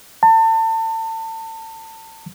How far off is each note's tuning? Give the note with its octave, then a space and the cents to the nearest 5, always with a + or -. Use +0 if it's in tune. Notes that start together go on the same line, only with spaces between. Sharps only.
A5 +30